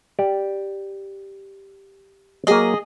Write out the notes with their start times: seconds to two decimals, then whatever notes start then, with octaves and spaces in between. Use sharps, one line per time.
0.19 G4 D5
2.47 F#3 A#3 G#4 D#5